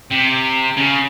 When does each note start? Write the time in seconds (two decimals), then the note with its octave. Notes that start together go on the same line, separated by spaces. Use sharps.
0.12 C3
0.77 C#3